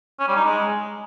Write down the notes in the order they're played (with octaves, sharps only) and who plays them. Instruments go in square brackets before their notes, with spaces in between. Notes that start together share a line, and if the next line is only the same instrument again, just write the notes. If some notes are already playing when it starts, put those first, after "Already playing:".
[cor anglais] C#4
G3
D#4
G#3